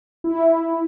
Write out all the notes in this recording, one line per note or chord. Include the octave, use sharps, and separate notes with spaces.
E4